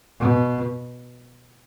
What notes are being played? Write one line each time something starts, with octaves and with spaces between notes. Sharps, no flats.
B2